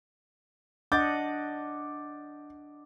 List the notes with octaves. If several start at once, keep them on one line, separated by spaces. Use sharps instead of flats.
D4 D#5 F#5 D6 G6 A6